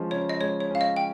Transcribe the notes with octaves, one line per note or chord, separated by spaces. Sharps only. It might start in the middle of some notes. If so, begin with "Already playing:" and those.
Already playing: F3 G#3 C#4
C#3 C#5
D#5
G#3 C#5
C#5
C#4 F5
D#5
G5